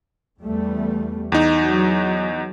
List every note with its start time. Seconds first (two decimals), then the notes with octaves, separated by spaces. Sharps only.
0.44 E2 G3 A3
1.32 E2 D#4
1.63 F#3